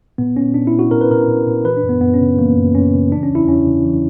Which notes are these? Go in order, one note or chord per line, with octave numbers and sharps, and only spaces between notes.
A#2 B3
A#2 C#4
A#2 D4
E4
A#2
F#4
A#2 A#4
B4
A#2 A#4
A#2
A#2
E3 B4
D4
F#2
B3
F#2 B3
C#4
C#3
E3 A#3
F#2
F#2 C#4
C#3
E3 D4
C#4
E2
E4
E2 C#4
C#3
E3